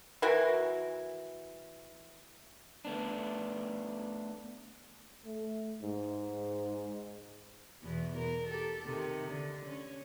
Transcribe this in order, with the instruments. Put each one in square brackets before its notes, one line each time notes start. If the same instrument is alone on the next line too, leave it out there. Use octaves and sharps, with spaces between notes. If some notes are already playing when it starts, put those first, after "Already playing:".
[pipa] E3 F#4 A#4 G#5
[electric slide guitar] A3 B3 D4
[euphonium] A3
G#2
[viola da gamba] E2 B2 E3
A#4
G4 A4
C3 D#3
D3
C#4